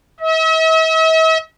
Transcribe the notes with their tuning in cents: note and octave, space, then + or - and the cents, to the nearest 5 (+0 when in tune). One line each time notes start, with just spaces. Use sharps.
E5 -45